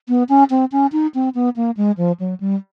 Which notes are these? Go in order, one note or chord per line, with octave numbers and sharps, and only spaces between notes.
B3
C#4
C4
C#4
D#4
C4
B3
A#3
G#3
F3
F#3
G3